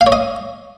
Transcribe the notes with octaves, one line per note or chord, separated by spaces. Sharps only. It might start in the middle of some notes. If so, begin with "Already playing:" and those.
F5
C#5
D#5